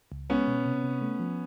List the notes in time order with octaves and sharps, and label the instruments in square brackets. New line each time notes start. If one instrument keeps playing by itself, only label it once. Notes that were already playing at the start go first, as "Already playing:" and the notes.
[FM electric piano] C#2
[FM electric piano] G#3 [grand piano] B3 C#4
[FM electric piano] B2
C3
C3
A3
F3